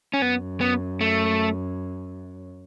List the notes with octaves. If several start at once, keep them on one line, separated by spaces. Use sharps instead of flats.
C#4
F#2 B3
B3
A3